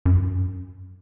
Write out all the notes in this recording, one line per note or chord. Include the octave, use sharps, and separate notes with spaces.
F#2